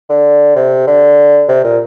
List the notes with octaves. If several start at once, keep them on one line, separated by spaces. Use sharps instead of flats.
D3
C3
D3
C3
A#2